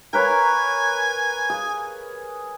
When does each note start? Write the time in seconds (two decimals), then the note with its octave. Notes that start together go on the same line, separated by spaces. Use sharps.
0.13 A#4 B4 C#5 G#5
1.50 G#4